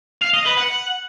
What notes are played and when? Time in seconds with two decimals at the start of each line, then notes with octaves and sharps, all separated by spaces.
0.22 F5
0.34 D#5
0.46 B4
0.57 F#5